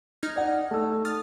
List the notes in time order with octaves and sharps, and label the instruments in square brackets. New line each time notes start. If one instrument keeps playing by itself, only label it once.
[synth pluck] D#4 F6 G#6
[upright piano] D5 F#5
A3 A5 E6
[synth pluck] D#6 F6 A6